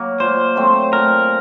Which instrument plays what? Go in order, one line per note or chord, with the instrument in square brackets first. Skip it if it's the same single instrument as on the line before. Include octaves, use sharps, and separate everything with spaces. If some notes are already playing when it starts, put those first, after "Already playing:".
Already playing: [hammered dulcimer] F#3 A#3
[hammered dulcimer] A#2 [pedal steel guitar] C5
[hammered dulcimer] F#3 A3 C4
[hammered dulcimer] A#2 [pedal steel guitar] A#4